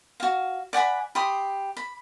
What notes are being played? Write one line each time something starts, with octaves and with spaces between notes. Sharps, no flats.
F#4 F5
D5 F#5 G#5 B5
G4 B5 C6 D#6
B5